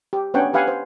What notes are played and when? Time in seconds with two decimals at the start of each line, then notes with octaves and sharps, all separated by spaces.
0.13 G4
0.34 B3 C#4 D4 C#5 F#5 G5
0.53 G4 B4 F5 F#5 G#5
0.68 C5